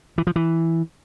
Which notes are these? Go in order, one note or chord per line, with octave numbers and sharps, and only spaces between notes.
E3
F3
E3